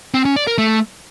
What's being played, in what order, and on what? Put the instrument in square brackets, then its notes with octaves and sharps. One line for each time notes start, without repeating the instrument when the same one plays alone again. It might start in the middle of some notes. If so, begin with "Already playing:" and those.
[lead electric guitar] C4
C#4
D5
A#4
A3